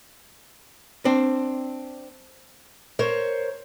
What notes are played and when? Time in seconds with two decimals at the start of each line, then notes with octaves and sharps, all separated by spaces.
1.05 C4 D4
2.99 A#4 C5 C#5